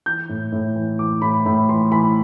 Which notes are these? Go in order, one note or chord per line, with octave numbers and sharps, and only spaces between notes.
E3 G6
A2
A2
E3
E3 D6
A2 B5
A2 B5
E3 C6
E3 B5